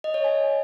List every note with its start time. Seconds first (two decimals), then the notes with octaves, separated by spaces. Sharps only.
0.04 D#5
0.14 C#5
0.24 G#5